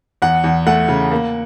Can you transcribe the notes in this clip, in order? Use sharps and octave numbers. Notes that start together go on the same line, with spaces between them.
E2 F#5
E2
A3 F#5
C#3
A#3